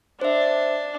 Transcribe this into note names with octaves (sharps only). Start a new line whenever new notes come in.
D4 C5 E5